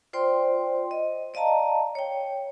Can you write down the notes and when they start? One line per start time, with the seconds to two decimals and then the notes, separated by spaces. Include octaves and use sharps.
0.13 F4 C5 D5 G5 C6
0.91 D#5
1.34 D5 D#5 F5 A5 A#5
1.95 C#5 G5